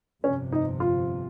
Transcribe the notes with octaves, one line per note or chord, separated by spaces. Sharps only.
G1 F2 C3 C#4
D#4
F4